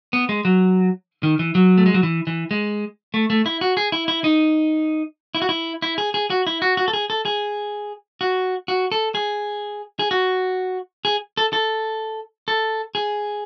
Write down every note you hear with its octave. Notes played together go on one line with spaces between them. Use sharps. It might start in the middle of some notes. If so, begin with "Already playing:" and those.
B3
G#3
F#3
D#3
E3
F#3
A3
G#3
F#3
E3
E3
G#3
A3
A3
E4
F#4
G#4
E4
E4
D#4
E4
F#4
E4
E4
G#4
G#4
F#4
E4
F#4
F#4
A4
G#4
A4
G#4
F#4
F#4
A4
G#4
G#4
F#4
G#4
A4
A4
A4
G#4